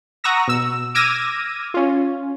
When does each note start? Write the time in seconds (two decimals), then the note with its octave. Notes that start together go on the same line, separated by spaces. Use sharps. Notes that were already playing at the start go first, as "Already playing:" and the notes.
0.24 F#5 A#5 C#6 D#6 E6 A#6
0.48 B2 E6
0.95 D6 E6 F6 G#6 A#6 D#7
1.74 C#4 F4